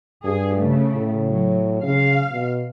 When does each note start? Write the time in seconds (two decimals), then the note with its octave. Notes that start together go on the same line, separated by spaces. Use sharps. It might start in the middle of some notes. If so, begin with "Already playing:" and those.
0.25 G2 G#4
0.56 C#3 A3
0.93 A2
1.25 F#3
1.82 C#3 F5
2.31 B2